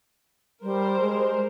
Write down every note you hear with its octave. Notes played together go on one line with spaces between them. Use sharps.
G3 A#4 C5
G#3